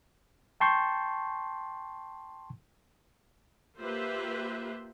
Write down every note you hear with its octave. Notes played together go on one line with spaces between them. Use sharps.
G5 A5 C6 C#6 G6
A#3 F4 G4 B4 C5 E5